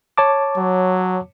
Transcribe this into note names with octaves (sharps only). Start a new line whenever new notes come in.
C#5 A5 D6
F#3